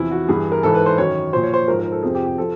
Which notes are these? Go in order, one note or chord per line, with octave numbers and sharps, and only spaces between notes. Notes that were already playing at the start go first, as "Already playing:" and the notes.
Already playing: E2 C3 F3 E4
F#4
G2 E3 G#4
A#4
G#2 E3 A4
B4
C5
F#2 D#3 C#5
A#2 F3 C5
C#5
C5
G#2 F3 A#4
A#4
A4
F2 C3 F3 G#4
G4
G4
F3 A4